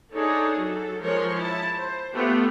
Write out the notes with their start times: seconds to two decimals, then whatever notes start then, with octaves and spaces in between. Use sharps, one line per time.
0.14 D4 D#4 G#4 A4 C#5
0.57 F#3 A4
1.02 F3 G#3 A#4 C#5 C6
1.36 E4 A5
1.75 C5
2.13 A3 B3 F4 G4